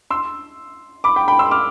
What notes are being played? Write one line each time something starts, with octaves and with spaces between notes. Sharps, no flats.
C6 E6
B5 D6
G5 B5
G5 B5
C6 E6
D6 F6